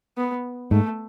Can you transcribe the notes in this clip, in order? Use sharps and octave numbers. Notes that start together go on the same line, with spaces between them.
B3
G#2 A3